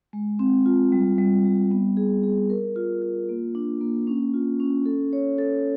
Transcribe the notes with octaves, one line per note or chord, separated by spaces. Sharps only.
G#3
C4
F4
G3
G3
G3
B3
G#4
G#4
A#4
F4
F4
A#3
D4
A#3
C#4
F4
C#4
A4
C#5
A4